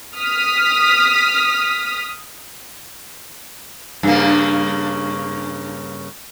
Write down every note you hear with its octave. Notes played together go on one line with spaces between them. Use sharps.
D#6 F6 B6
G2 C#3 A#3